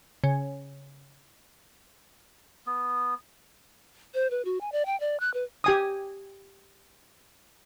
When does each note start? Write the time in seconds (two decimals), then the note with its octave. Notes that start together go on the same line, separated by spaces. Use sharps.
0.24 C#3
2.66 B3
4.14 C5
4.31 B4
4.45 F#4
4.61 G#5
4.72 D5
4.86 G5
5.00 D5
5.20 F#6
5.34 B4
5.64 G4 G#5 D#6